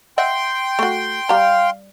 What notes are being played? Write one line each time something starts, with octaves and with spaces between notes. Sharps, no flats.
D#5 E5 F#5 G5 C6
A3 F#4
G3 F5 A#5